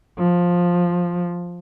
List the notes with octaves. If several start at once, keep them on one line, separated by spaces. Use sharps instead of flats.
F3